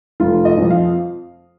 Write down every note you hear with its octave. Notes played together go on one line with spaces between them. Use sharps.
F1 F4
D#5
F2 F3
F5